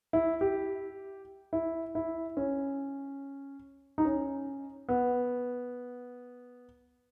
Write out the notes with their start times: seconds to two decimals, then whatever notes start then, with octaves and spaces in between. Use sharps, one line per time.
0.13 E4
0.41 G4
1.53 E4
1.95 E4
2.37 C#4
3.98 D#4
4.05 C#4
4.89 B3